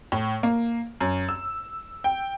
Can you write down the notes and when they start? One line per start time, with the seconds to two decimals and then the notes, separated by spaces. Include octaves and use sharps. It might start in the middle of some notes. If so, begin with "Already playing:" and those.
0.12 A2
0.43 A#3
1.01 F#2
1.29 E6
2.04 G5